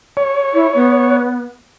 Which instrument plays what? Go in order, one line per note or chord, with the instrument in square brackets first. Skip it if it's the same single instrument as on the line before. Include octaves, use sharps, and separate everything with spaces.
[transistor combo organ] C#5
[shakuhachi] E4
B3